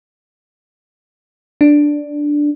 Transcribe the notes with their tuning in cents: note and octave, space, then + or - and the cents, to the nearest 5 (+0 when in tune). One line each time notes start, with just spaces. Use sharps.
D4 +0